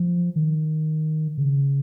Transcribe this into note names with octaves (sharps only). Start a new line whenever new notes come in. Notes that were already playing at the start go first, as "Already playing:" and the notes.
Already playing: F3
D#3
C#3